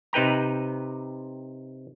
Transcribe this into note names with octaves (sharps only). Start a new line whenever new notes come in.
C3 D#4 B4 G5 A#5